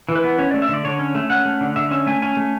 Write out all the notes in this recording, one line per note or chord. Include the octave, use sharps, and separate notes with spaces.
E3
B4
B3
C#4 C#5
A3 D5
E5
D3 D5
D3 C#5
C#4
A3
C#4 F#5
A3
D3
D3 E5
C#4 E5
A3 G#5
C#4 G#5
A3